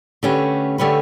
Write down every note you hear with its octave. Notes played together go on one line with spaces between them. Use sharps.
D3 A3 C#4 G4 B4
D3 A3 C#4 G4 B4